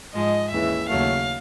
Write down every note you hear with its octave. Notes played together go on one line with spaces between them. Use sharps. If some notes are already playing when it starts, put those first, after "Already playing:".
G#2 F3 G#3 D#5
D#2 C#3 E3 E5
D#2 C#3 F#3 A3 F5